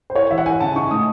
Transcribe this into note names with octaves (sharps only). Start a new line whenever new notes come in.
C5
E4 C#5
E3 E5
F#5
E4 G#5
C#3 A5
D#4 C#6
A2 D#6